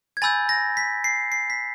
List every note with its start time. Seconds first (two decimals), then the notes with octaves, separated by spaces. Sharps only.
0.17 G#6
0.22 G#5 B5 E6 G6 A6
0.49 A#6
0.77 B6
1.04 C7
1.32 C7
1.50 B6